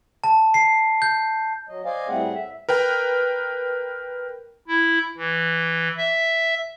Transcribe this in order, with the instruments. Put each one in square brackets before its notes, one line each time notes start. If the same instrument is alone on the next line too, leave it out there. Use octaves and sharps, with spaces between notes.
[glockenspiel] A5
C7
G6
[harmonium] F#3 D#5
C5 D5 D#5 F5 G#5
A2 G3 A3 C4 G#4 F#5
E5
[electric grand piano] A#4 B4 G5
[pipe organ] E4
E3
E5